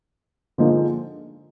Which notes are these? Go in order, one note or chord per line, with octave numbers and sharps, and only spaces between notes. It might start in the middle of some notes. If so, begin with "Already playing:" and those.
D3 F3 G#3 A#3 D#4